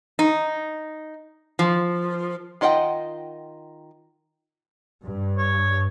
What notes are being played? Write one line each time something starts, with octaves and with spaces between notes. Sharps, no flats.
D#4
F3
D#3 F4 D#5 F#5 G5
G2
C#5